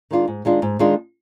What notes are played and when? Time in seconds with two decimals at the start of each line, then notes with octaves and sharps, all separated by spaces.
0.11 D#3 G#3 D4 F4
0.28 G#2
0.45 D#3 G#3 D4 F4
0.62 G#2
0.79 D#3 G#3 D4 F4